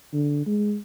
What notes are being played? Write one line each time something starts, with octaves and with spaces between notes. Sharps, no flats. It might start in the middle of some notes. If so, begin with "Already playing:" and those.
D3
G#3